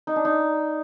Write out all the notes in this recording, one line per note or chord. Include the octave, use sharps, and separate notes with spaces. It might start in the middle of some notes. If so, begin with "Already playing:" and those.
D#4
D4
D#4